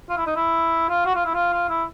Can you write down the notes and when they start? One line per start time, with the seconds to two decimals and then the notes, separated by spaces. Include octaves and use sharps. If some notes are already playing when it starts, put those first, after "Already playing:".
0.09 F4
0.18 E4
0.26 D#4
0.36 E4
0.89 F4
1.06 F#4
1.15 F4
1.25 E4
1.34 F4
1.53 F4
1.69 E4